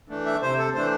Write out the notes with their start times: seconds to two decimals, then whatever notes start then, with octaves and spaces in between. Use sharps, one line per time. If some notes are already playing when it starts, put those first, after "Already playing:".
0.09 E3 A3 D4
0.26 E5
0.41 C3 C5
0.58 A4
0.74 E3 A3 D4 C5